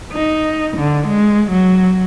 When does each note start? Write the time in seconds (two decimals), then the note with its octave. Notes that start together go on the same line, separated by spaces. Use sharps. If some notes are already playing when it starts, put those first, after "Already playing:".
0.13 D#4
0.77 D3
1.07 G#3
1.51 F#3